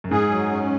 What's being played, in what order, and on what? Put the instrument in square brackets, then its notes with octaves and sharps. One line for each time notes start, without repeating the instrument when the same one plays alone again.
[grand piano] F#2
[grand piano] G#2 [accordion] G#4
[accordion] F#3
C#4